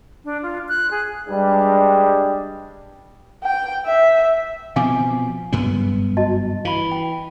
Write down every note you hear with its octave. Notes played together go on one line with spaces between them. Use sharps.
D4
F4
F#6
G#4
G2 G3 G#3 D4 G4
G5
E5
B2 F3 C4 F5 G#5 D6
F#1 G2 B3
F#4 D#5 A5
E3 F5 B5
G5